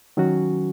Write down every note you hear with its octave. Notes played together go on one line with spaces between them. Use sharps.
D#3 F#3 C#4 F#4